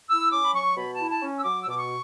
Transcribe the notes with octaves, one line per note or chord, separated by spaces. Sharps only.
E4 E6
C#4 D6
B5
F#3 C#6
B2 B5
A5
E4
A5
C#4
E6
F#3 D6
E6
B2 D6
C#6